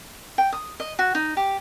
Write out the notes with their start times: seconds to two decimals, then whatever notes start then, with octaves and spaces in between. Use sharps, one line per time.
0.38 G5
0.52 D#6
0.80 D#5
0.99 F#4
1.15 D#4
1.37 G4